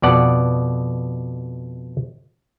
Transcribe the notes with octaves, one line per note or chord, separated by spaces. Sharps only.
F2 B2 D5 F#5